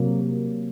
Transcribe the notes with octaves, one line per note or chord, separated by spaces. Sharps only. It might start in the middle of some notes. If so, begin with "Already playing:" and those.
Already playing: C3 F#3 A#3